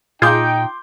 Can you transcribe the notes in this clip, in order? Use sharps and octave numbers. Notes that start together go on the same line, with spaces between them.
A#2 D#4 F4 G#4 G5 C6 D6 G6